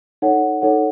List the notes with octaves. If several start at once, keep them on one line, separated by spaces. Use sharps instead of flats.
D#4 A4 C#5 F#5
D#4 A4 C#5 F#5